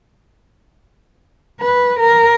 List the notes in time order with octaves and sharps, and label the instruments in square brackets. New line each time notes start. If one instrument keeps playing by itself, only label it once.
[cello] B4
A#4